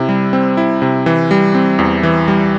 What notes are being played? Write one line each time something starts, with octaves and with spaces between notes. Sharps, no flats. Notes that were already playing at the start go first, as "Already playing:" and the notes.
Already playing: C3 E4
G3
C4
E4
C3
E3
G3
C4
E2
E3
G3